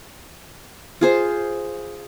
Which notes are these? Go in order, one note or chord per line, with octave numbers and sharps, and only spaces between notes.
F4 G#4 C5